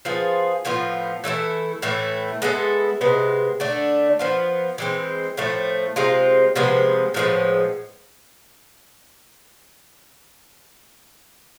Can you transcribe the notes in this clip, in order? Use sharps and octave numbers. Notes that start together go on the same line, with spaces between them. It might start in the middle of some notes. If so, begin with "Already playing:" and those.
F3 B3 F4 G#4
A2 F3 B3 F4
E3 A3 E4 A4
A2 E3 A3 E4
G#3 B3 E4 A4
C3 G#3 B3
D3 A3 D4
F3 B3 F4
E3 G#3 C4
A2 F3 A3
C3 G#3 C4 F4
C3 F3 G#3 B3
A2 F3 G#3 B3